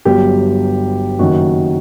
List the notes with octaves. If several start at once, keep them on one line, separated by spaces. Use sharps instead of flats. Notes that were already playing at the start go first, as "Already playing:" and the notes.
G1 G2 F#3 G4
F#1 F#2 D#3 F#4